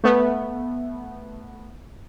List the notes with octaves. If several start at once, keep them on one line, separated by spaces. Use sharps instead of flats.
A3 B3